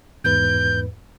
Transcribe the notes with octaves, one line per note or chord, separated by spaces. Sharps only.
E2 G#2 B4 G6